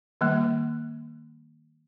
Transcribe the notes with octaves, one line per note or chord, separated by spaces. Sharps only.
D#3 G3 A#3